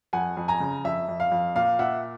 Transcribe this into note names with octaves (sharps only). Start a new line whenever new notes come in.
F2 F#5 G#5
F2
G#5 A#5
C#3
F2 E5
F2
F5
F2
A#2 F5
A#2 E5 F#5